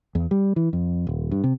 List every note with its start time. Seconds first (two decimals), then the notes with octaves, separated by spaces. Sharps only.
0.15 E2
0.31 G3
0.56 E3
0.73 F2
1.07 D#1
1.31 G2
1.44 C3